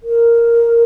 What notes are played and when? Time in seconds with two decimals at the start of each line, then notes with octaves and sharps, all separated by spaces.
0.03 A#4